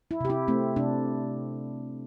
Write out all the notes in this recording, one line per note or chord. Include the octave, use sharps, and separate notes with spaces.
E4
C3 G4
E4
A3 C4
C3 D4